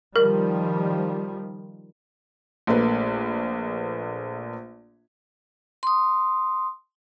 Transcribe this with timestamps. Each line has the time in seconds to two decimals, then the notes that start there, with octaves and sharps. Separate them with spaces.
0.16 D#3 F3 G3 A#4
2.67 A#1 A3 A#3 B4
5.83 C6 D#6